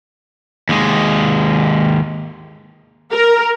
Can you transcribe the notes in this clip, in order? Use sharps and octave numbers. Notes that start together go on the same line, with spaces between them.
D#2 G#3
A#4